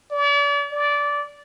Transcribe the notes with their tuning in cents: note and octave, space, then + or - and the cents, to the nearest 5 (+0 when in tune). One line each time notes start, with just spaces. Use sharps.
D5 -40
D5 -15